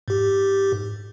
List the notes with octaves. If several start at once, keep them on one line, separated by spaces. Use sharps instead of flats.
G#2 G4